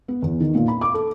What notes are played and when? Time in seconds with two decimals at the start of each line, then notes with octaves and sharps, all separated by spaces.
0.08 B3
0.22 E2
0.40 D#3
0.55 A#2
0.68 B5
0.81 D6
0.94 A4